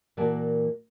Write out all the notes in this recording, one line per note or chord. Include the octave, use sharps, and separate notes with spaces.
A#2 E3 F#4 A#4 D5 A5